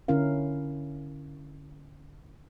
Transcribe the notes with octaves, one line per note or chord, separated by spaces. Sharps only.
D3 C#4 E4 A#4 F5